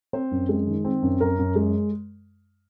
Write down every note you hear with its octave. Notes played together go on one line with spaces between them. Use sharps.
C4 C5
F#2
G#3
D#3
C4
F#2
F#2 A#4
F#2
G#3